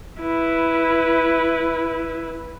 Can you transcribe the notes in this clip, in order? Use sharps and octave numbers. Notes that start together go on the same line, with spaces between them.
E4 B4